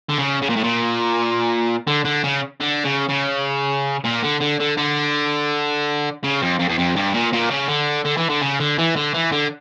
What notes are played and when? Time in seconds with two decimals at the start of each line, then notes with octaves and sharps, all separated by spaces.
0.09 D3
0.18 C#3
0.42 C#3
0.49 A#2
0.56 A2
0.63 A#2
1.87 D3
2.05 D3
2.24 C#3
2.60 D3
2.84 C#3
3.09 C#3
4.05 A#2
4.24 D3
4.41 D3
4.60 D3
4.78 D3
6.24 C#3
6.42 F2
6.60 F2
6.69 E2
6.78 F2
6.96 G2
7.14 A#2
7.33 A#2
7.51 C#3
7.68 D3
8.05 D3
8.17 E3
8.29 D3
8.41 C#3
8.60 D3
8.78 E3
8.96 D3
9.14 E3
9.32 D3